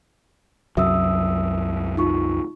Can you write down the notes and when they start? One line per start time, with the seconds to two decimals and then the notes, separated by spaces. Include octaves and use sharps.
0.77 C2 F#2 F#3 E5 D#6 E6
1.97 D#4 F4 C#6